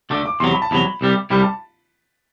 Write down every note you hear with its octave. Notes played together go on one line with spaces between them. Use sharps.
D2 D3 A3 D6
D6
E2 C3 F#3 C6
B5
A5
E2 C3 F#3 B5
C2 C3 G3
C2 C3 G3 B5
A5